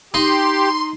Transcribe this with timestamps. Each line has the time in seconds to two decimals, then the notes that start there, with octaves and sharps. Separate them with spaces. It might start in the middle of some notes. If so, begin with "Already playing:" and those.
0.14 D#4 G4 C6